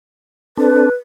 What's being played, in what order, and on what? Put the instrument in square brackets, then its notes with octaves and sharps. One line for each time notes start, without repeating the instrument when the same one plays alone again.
[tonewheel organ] C4 D4 A4 [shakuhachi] B4